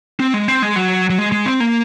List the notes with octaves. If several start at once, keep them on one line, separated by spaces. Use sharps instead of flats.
C4
G#3
C4
G#3
F#3
F#3
G#3
G#3
C4
A#3